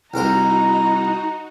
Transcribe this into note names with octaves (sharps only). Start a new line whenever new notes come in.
C2 D#4 E4 F#4 A#4 C5 A#5